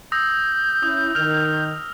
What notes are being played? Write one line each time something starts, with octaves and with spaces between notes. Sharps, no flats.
D#6 E6 G6 A#6
C#4 E4 D#6
D#3 F6 F7